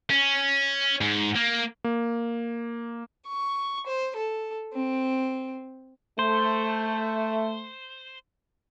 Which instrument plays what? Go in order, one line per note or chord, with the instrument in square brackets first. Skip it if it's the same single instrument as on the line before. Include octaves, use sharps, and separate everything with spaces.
[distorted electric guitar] C#4
G#2
A#3
[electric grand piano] A#3
[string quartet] C#6
C5
A4
C4
[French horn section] A3 [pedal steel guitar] C5